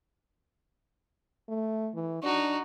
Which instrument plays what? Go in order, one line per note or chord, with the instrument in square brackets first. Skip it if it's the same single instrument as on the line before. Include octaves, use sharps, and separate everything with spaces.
[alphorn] A3
E3
[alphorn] D4 [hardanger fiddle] D#4 F#4